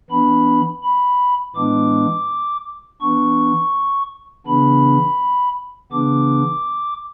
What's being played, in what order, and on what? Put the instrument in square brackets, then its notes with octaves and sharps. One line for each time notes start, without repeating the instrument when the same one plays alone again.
[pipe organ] E3 B3 D4 B5
B5
A2 E3 G#3 B3 D4 D6
E3 B3 D4 C#6
C#3 E3 B3 D4 B5
C#3 E3 B3 D4 D6